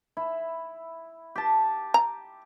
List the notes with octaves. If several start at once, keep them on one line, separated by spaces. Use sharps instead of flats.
E4
G4 A5
A#5